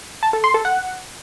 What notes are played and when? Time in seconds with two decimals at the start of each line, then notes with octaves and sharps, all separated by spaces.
0.23 A5
0.33 A4
0.44 C6
0.54 A4
0.65 F#5